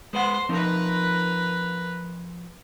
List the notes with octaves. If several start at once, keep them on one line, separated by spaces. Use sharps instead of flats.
G#3 B4 C5 F#5
F3 C4 D#4 A#4 B4